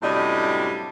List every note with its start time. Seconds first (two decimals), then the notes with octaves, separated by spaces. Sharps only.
0.02 F#2 A2 C3 G3 D4 D#5